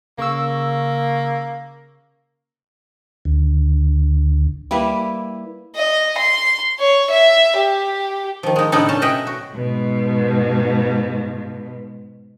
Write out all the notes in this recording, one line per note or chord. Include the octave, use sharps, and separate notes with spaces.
C#3 A#3 C#6 E6
D2
G3 A#3 E4 B4
D#5
C6
C#5
E5
G4
D#3 F3
G#3 D#4
A2 C#3 B3 D4 D#4 A4
C#4 A5
B2 D#5 E5 F#5 G5
F#4
G#2 B2